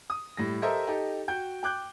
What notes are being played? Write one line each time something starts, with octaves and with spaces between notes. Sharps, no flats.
D#6
A2 G3 A#6
G4 A4 A#4 C5 D#5 E5
D#4 G4 A4
F#4 G5 G6
G5 D6 F#6 G6